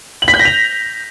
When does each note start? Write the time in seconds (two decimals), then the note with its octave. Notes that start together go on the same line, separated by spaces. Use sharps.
0.22 F#7
0.28 B6
0.34 G6
0.39 A#6
0.45 F7